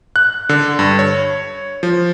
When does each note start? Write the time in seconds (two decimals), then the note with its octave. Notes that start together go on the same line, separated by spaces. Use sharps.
0.16 F#6
0.49 D3
0.79 G2
0.99 C#5
1.83 F3